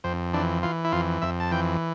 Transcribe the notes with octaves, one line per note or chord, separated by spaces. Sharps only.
F2 C4
E3 D4
E3 F4
E4
F2 F4
F2 E5
A5
E3 G5